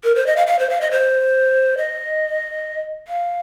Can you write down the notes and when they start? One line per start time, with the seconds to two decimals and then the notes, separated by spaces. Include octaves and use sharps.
0.04 A#4
0.15 C5
0.26 D#5
0.36 F5
0.47 F5
0.59 C5
0.70 F5
0.81 D#5
0.91 C5
1.78 D#5
3.08 F5